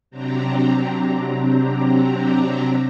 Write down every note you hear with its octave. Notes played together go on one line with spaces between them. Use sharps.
C3 F#3 C4 D4 G4 A#5